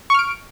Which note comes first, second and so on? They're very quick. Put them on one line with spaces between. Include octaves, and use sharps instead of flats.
C#6 F6 D7